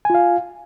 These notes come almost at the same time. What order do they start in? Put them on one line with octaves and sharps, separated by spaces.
G#5 F4 F5